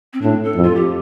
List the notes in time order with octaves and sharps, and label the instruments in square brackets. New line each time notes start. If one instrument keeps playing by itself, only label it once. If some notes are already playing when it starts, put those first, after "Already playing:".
[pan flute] C4
[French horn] A2 [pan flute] D4
[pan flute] A4
[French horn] F2
[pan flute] F4
G4